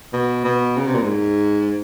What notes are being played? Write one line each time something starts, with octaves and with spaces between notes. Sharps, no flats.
B2
B2
C#3
C3
A#2
G#2